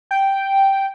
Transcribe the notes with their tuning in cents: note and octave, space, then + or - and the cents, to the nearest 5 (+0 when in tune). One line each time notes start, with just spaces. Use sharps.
G5 -5